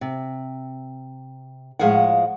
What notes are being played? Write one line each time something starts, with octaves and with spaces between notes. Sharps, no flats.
C3
A2 F3 G#3 F5 F#5